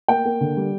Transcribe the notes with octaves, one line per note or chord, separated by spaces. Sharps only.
A#3 G5
A#3
D3
G3